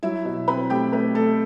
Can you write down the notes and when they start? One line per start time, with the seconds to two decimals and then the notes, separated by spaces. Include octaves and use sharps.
0.03 F#3 E4 E5
0.25 B2
0.48 C4 B4 B5
0.70 A3 G4 G5
0.92 A3 B4
1.15 A3 A4